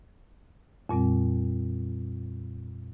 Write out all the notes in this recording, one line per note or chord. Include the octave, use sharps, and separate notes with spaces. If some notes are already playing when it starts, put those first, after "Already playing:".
F2 A#2 G3 C4